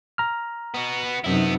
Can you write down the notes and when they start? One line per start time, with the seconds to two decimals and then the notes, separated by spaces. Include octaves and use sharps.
0.18 A#5 F6
0.74 B3 F#4
1.24 F#2 C3 B3 D#4 E4